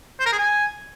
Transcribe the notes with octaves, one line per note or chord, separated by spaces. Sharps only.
C5
A#4
G#4
G#5